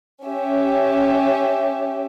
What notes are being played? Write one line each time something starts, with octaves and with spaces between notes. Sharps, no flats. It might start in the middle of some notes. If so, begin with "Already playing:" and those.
C#4 G4 E5